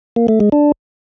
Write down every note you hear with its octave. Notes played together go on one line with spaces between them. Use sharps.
A#3
A3
G#3
D4